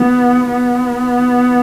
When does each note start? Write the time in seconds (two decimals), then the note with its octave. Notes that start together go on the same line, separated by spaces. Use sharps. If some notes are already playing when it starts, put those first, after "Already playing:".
Already playing: B3
0.49 B3